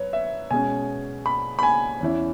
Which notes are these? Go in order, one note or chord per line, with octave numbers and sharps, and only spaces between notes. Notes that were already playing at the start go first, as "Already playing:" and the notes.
Already playing: F#3 B4 C#5
E5
B2 G#3 C#4 G#5
B5
B5
G#5
E2 E3 C#4 E4